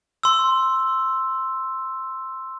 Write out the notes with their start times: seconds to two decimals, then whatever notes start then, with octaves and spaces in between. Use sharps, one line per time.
0.23 C6 E6